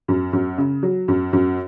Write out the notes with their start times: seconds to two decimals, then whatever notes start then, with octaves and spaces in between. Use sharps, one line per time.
0.08 F#2
0.33 F#2
0.58 C#3
0.83 F#3
1.08 F#2
1.33 F#2